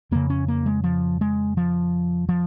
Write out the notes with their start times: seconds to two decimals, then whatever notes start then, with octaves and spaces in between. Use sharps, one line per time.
0.11 F2 C#3 A#3
0.30 C#4
0.48 A#3
0.66 G#3
0.84 F3
1.21 G#3
1.57 F3
2.29 F3